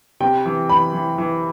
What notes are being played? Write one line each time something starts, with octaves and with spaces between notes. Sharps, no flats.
C3 G5
E3
E3 B5
E3
E3